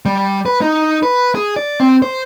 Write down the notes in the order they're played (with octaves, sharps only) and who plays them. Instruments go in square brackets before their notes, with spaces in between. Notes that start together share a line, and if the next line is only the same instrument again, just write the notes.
[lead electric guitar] G3
B4
D#4
B4
G#4
D5
C4
C5